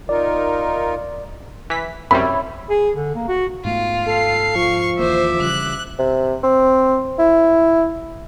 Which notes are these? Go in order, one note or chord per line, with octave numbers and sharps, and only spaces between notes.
D#4 F4 A#4 D5
E3 B6
F#2 C3 G3 E4 C#5 B5
G#4
D3
A#3
F#4
G#2 A3 B3 F4
A4 F5 C7
F3 C#6
D#2 E3 A#3 C5 E5 D6
C#3 E3 G3 F#6
C3
C4
E4